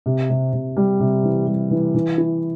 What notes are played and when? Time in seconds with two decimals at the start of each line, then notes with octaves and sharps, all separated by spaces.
0.06 C3
0.30 C3
0.53 C3
0.77 G3
1.00 C3
1.23 E3
1.47 G3
1.71 E3
1.94 E3
2.18 E4